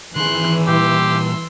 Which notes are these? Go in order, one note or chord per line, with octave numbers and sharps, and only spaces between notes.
D#3 E3 G#4 C6 F#6
A#2 G3 G4 C6 E6